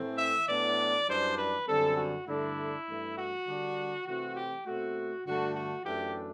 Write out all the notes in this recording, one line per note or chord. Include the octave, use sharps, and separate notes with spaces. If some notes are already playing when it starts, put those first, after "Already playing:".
Already playing: A2 E3 A3 C4
E5
A2 E3 B3 D4 D5
F#2 E3 G3 D4 C5
B4
F#2 D3 G3 C4 A4
F#4
G2 D3 A3 D4 E4
G2 E3 A3
F#4
D3 G3 D4
C3 E3 A3 C4 F#4
G4
B2 A3 C4 F#4
G2 D3 A3 D4 F#4
F#4
F#2 E3 A3 D4 G4